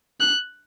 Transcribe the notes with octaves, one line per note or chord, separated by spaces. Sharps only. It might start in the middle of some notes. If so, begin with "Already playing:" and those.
F#6